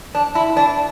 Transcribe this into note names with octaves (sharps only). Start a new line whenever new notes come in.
D4
E4
D4